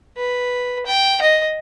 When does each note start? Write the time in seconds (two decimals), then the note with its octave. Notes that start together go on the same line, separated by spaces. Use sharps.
0.17 B4
0.86 G5
1.22 D#5